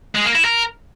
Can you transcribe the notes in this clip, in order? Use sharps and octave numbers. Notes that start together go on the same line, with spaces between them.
G#3
A#3
E4
A#4